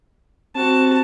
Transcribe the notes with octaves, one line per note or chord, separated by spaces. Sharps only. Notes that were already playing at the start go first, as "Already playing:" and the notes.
C4 F#4 A5